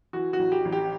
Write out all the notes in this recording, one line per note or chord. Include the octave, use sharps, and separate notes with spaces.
E3 F#4
F#4
A1
G4
A1
G4